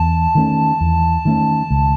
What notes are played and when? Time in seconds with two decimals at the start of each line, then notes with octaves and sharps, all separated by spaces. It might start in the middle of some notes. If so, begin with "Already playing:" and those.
Already playing: E2 A5
0.35 D#3 A3 C#4
0.81 E2
1.25 D#3 A3 C#4
1.70 C#2